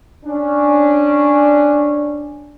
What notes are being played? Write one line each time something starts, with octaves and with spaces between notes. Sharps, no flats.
C#4 D4